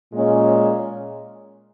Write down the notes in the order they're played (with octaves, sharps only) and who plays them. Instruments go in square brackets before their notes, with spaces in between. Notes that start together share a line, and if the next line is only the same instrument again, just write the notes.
[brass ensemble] A#2 G#3 C#4